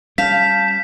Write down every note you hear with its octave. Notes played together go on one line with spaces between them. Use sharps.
G3 C#4 F5 A5 G6 B6